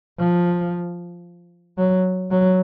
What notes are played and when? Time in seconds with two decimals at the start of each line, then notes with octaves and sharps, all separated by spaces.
0.19 F3
1.78 F#3
2.31 F#3